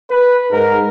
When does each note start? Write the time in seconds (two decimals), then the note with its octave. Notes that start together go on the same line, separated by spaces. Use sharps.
0.10 B4
0.52 G#2 A#4